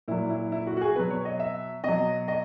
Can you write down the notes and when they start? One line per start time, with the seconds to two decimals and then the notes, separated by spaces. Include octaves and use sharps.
0.08 A#2 F#3 E4
0.30 E4
0.52 E4
0.66 F#4
0.77 F#4
0.81 G#4
0.96 B2 F#3 B4
1.10 C#5
1.25 D#5
1.40 E5
1.84 B2 F#3 D#5
2.28 D#5